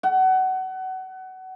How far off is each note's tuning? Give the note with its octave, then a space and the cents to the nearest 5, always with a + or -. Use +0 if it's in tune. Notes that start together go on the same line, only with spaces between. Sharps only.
F#5 +25